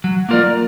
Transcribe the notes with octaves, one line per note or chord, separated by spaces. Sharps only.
F#3
A#3 F4 A#4 D5